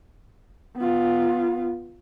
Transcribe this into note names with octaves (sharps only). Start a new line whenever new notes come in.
B3 F4